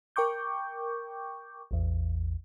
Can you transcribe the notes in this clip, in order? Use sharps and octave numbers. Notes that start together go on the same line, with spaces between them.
A#4 G5 C#6 D6 G6
A1 E2